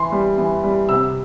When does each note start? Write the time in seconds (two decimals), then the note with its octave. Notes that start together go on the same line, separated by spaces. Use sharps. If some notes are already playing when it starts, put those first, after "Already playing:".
Already playing: E3 C6
0.12 G3
0.38 E3
0.64 G3
0.89 C3 E6